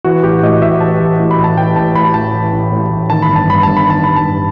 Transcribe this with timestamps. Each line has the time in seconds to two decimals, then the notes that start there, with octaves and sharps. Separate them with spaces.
0.04 E3 F#4
0.23 A1 G4
0.43 A2 D#5
0.61 A1 E5
0.81 E3 A5
1.00 A1
1.20 A2
1.31 B5
1.38 A1
1.44 A5
1.57 E3 G5
1.76 A1 A5
1.95 A2 B5
2.14 A1 A5
2.34 E3
2.53 A1
2.72 A2
2.90 A1
3.10 D#3 A5
3.22 B5
3.29 G1
3.36 A5
3.47 G2 B5
3.63 G1 A5
3.77 B5
3.86 D#3 A5
4.04 G1 B5
4.16 A5
4.24 G2